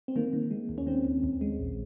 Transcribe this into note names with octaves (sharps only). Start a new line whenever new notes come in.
C4
D#3 A#3
D#3
G#3
D#2
C#4
D#3 C4
D#2
D#2
G#3
A#1